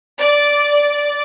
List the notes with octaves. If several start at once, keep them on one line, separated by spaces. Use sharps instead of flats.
D5